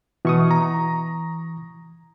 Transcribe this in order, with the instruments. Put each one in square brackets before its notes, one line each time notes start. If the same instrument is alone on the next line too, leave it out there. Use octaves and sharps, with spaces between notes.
[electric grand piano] B2 [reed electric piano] E3 C#6 D#6
[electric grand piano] A#5